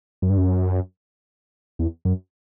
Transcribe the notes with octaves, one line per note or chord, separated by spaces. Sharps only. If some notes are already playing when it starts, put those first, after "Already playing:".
F#2
G2
F#2
E2
F#2